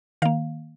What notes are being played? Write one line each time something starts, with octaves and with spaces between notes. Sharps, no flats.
D#3 A#3 F5